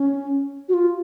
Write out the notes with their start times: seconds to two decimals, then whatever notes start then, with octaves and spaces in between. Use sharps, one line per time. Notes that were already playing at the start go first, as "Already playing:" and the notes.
Already playing: C#4
0.69 F#4
0.74 F4